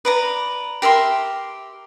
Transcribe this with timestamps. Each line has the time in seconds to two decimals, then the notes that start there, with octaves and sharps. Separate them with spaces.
0.05 B4 D5 A#5
0.82 G4 A#4 E5 C6